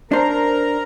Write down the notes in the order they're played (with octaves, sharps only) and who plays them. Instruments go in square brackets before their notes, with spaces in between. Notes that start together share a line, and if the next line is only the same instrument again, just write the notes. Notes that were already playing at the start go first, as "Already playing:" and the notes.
[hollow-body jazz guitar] D4 C5 [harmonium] A#4 A#5